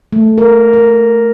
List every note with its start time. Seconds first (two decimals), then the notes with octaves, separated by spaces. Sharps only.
0.13 A3
0.38 A#4
0.73 A#4